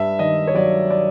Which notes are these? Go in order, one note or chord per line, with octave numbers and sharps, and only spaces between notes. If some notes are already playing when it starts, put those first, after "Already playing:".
Already playing: G2 E5
D#3 D#5
C#5
F#3 D5
D5